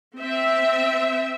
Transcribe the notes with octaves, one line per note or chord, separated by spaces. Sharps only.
C4 E5